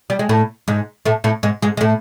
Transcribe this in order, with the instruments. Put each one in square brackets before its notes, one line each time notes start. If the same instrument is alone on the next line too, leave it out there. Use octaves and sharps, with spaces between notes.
[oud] G3
G#3
A2 A3
G#2 G#3
A2 A3
A2 A3
G#2 G#3
G#2 G#3
G#3
A2 A3